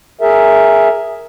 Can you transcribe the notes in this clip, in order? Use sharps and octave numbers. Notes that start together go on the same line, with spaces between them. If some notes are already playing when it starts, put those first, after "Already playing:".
G#4 A#4 E5